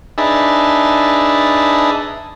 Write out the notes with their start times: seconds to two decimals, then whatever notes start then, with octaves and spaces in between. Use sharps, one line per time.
0.18 D4 D#4 G#4 B4 E5 A5